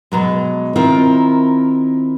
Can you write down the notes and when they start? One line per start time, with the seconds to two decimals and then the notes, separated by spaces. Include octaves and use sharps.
0.12 B2 F#3 G#3
0.75 D#3 C4 E4 F4 A#4